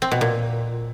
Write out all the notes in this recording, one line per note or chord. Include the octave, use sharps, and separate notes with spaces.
C4
B2
A#2